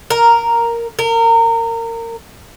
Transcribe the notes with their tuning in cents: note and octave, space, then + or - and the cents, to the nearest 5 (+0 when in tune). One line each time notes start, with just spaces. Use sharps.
A#4 +0
A#4 -25